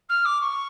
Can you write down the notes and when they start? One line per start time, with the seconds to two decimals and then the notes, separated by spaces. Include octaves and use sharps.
0.09 F6
0.25 D6
0.41 C#6